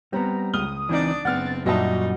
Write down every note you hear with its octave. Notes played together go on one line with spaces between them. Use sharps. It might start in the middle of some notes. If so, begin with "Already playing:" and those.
G3 B3 C4 A#5
C#2 D#6 F6 G7
E3 C4 D4 D#4 D5
F#1 B3 C4 F#5 F6 A6
F#2 A#2 G3 D#4 F#4 D#5 E5 A5